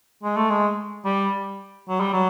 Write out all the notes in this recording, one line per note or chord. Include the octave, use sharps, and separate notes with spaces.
G#3
A3
G#3
G3
F#3
G3
F#3